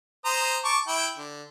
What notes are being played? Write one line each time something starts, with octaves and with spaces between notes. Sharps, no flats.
C5 A#5 D#6
A5 C#6 D6
E4 G5
D3